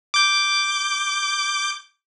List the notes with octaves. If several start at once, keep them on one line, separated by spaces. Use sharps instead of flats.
D6 G6